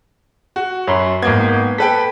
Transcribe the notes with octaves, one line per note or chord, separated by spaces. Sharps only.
F#4
F#2 C#5 B5 C6
G#1 A#3 B3 G#6
A4 B4 G5 B6